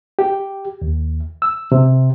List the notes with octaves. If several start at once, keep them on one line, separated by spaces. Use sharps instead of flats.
G4
D#2
E6
C3